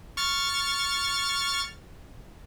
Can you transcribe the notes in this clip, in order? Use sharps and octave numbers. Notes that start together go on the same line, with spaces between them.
C#6 F6 A6